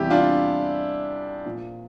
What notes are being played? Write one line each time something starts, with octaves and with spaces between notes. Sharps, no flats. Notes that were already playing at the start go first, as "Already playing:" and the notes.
Already playing: E2 C3 G3 E4 G4
D4 F4
A#2 F3